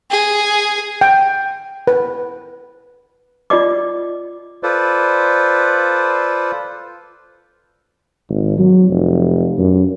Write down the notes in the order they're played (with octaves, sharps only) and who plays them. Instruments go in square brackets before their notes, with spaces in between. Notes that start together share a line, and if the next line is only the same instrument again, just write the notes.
[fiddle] G#4
[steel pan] G5
B4
[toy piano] F4 D5 D#5 D6
[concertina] F4 A4 B4 C5 D5
[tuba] G#1
F#3
F1
F#2